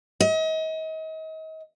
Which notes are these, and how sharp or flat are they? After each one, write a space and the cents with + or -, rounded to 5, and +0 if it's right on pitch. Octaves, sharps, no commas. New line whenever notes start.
D#5 +35